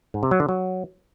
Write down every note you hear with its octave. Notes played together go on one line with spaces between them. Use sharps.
G#2
C3
F#3
D3
F#3